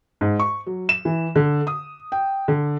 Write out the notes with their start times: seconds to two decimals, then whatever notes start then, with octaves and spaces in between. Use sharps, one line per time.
0.21 G#2
0.39 C#6
0.67 F#3
0.89 E7
1.05 E3
1.36 D3
1.67 D#6
2.12 G5
2.48 D3